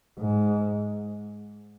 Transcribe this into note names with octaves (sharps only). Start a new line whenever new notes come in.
G#2